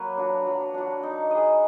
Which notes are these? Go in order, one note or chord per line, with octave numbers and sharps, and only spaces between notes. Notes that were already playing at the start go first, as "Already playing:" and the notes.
Already playing: F#3 A#3 B4
D4 F#4
F#3
D4 F#4
D#4
G#4 D#5